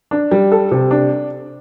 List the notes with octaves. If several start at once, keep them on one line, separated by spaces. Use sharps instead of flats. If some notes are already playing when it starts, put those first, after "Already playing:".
D4
G3
A4
C3
D4